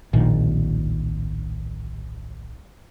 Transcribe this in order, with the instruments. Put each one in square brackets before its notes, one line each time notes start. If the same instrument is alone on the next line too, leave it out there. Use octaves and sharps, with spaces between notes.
[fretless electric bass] D1 A#1 A#2 D#3